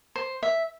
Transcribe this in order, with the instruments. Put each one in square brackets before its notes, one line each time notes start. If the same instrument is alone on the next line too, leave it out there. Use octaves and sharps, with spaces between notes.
[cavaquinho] C5
E5